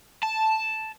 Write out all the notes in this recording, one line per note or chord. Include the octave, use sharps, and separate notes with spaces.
A5